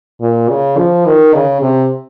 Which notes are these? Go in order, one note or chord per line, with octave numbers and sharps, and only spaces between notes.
A#2
C#3
F3
D#3
C#3
C3